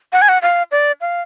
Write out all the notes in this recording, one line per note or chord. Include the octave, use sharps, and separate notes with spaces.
F#5
G#5
F#5
F5
D5
F5